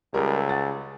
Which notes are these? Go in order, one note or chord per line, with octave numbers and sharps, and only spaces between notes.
C#2 G3 A#4
F#5 A6